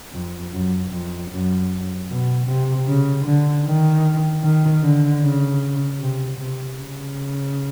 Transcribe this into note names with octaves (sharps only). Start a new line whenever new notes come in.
F2
F#2
F2
F#2
B2
C3
C#3
D3
D#3
D#3
D3
C#3
C3
C3
C#3